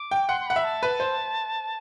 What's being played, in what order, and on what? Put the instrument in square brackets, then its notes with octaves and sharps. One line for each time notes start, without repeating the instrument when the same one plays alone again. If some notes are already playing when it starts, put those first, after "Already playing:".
Already playing: [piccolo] D6
[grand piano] G5
[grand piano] F#5 [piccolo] C6
[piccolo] C6
[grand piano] F#5 [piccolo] B5
[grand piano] E5
[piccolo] A5
[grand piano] B4
C5